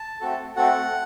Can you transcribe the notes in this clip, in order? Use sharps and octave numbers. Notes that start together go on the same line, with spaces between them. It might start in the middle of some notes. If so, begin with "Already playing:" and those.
Already playing: A5
A3 C4 F#4 A4
A3 C4 F#4 A4 F#5